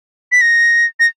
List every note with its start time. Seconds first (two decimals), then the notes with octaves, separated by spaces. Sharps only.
0.32 B6
0.41 A#6
1.00 A#6